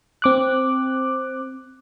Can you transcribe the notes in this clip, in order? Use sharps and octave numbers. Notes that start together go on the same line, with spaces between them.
C4 D6 F#6